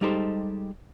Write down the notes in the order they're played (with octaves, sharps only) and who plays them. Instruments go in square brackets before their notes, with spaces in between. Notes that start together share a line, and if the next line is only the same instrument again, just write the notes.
[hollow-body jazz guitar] G3 G#3 D#4 G4 A4 C5